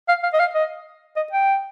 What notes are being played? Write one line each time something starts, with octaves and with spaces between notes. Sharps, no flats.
F5
F5
D#5
F5
D#5
D#5
G5